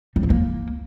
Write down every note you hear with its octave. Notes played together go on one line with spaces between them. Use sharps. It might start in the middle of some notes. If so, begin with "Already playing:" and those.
G3
F3
A#3